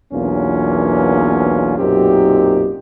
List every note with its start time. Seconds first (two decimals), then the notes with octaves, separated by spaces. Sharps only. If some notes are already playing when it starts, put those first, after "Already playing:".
0.13 B1 E2 A#3 C#4 D4 F4
1.78 B1 F#2 A#2 C4 D#4 G4